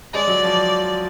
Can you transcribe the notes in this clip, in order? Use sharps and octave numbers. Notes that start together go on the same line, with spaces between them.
G#3 D5
F#3
F3